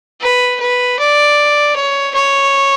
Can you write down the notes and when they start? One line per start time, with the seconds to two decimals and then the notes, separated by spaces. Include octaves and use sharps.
0.21 B4
0.60 B4
0.99 D5
1.76 C#5
2.15 C#5